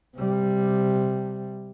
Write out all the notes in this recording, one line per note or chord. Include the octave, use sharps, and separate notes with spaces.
C3 G3